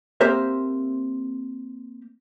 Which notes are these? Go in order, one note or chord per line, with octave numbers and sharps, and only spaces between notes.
A#3 C4 G4 A#4 C5 E5